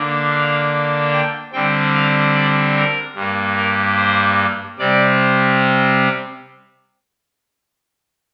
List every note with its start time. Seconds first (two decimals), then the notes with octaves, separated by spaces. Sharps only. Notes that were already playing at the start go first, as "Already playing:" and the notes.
Already playing: D3 A#3 D4
0.31 F5
1.13 G5
1.53 D3 G3 C4 G5
1.94 F5
2.35 D5
2.75 A#4
3.15 G2 G3 A#3
3.57 A#4
3.97 C5
4.79 C3 G3 C4 D5